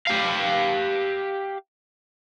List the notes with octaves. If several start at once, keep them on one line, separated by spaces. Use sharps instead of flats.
G4 F5